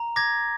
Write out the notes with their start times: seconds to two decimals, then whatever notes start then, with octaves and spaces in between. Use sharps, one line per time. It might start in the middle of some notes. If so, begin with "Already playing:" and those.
Already playing: A#5
0.16 D6 G#6 A#6